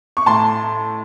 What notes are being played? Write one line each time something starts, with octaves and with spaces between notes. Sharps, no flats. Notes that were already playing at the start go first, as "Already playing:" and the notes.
C#6
A2 A5 C6